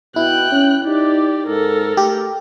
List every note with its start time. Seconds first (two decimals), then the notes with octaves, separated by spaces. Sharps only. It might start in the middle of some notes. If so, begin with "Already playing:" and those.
0.16 B2 E4 G5 F#6
0.52 C#4
0.85 D#4 G4 D5
1.47 G#2 A4 A#4
1.97 A3 G4